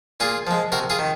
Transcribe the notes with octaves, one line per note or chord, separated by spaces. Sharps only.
A#2 F4 G#4
F3 G#3
C3 F#4 A#4
F4 G#4
D#3